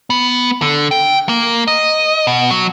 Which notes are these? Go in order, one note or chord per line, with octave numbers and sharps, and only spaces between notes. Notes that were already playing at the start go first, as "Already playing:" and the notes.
B3
D3
G5
A#3
D#5
B2
F#3